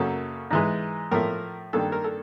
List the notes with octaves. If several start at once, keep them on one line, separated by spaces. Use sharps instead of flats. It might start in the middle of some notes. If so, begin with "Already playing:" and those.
Already playing: F#2 C#3 F#3 A#3 A4
G#2 E3 G#3
A2 F3 A3 A#4
G2 D#3 G3 A#3 A4
A#4
A4